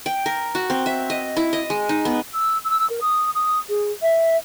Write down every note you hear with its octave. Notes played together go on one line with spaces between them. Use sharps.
G5
A#4
F#4
C4
E5
D#5
E4
D#5
G#3
D#4
B3
E6
E6
A#4
D#6
D#6
G#4
E5